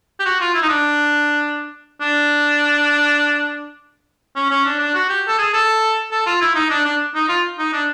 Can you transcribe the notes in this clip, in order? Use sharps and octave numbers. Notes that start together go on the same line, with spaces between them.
G4
F#4
F4
E4
D#4
D4
D4
C#4
C#4
D4
D4
F#4
G4
A4
G#4
A4
A4
F4
E4
D#4
D4
D4
D#4
F4
D#4
D4